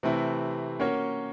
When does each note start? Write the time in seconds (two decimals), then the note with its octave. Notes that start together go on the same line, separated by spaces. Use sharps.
0.03 C3 E3 A3 C4 E4
0.80 A#3 C#4 F#4 A#4 C#5